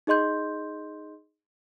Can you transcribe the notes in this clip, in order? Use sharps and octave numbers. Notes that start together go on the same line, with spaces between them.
D#4 G#4 D#5 C6 G6